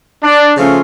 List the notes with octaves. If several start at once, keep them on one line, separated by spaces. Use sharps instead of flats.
D4
C#3 F3 A3 C#4 F4